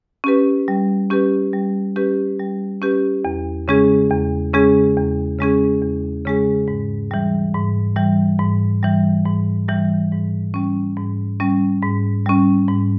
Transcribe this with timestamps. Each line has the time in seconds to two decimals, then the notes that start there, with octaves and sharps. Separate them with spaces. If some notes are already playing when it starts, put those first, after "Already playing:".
0.24 C#4 G4 B4
0.68 G3
1.10 C#4 G4 B4
1.53 G3
1.96 C#4 G4 B4
2.39 G3
2.82 C#4 G4 B4
3.25 E2
3.68 C#3 G#3 C#4 G#4
4.10 E2
4.54 C#3 G#3 C#4 G#4
4.97 E2
5.39 C#3 G#3 C#4 G#4
5.83 E2
6.25 C#3 G#3 C#4 G#4
6.68 G#2
7.11 E3 G3
7.54 G#2
7.96 E3 G3
8.39 G#2
8.83 E3 G3
9.26 G#2
9.68 E3 G3
10.12 G#2
10.54 G3 C#4
10.97 G#2
11.40 G3 C#4
11.82 G#2
12.26 G3 C#4
12.68 G#2